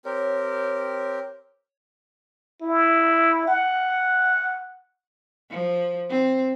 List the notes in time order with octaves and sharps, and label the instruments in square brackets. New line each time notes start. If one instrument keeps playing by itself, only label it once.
[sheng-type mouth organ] C4 G4 A#4 [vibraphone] C#5
[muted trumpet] E4
F#5
[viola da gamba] F3
C4